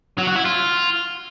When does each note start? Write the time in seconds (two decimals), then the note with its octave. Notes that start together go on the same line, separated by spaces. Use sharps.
0.18 F#3
0.27 F#4
0.36 E4
0.45 F4